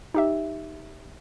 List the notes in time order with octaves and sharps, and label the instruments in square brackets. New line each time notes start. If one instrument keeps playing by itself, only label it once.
[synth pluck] D#4 G4 E5